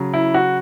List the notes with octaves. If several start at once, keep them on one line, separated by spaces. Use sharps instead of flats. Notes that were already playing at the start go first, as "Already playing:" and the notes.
Already playing: C#3 F#3
E4
F#4